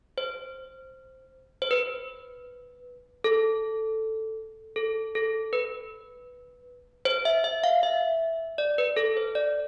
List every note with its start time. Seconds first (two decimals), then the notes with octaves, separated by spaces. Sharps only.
0.18 C5
1.62 C5
1.71 B4
3.24 A4
4.76 A4
5.15 A4
5.53 B4
7.05 C5
7.25 E5
7.44 E5
7.64 F5
7.83 E5
8.58 D5
8.78 B4
8.97 A4
9.17 C5
9.35 D5